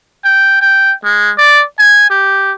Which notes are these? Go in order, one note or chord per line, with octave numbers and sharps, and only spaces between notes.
G5
G5
G#3
D5
G#5
G4